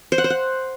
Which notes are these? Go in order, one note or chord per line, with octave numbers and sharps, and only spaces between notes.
C5
F#5
C5
F#5